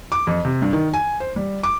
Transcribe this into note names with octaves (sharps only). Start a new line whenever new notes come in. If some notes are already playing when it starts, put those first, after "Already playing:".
D6
F2
C3
G2
D#3
G#5
C5
G3
D6